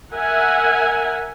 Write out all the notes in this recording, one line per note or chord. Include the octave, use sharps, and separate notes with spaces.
A#4 E5 F#5 G#5